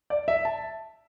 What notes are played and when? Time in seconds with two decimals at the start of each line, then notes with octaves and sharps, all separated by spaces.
0.10 D5
0.28 E5
0.45 A5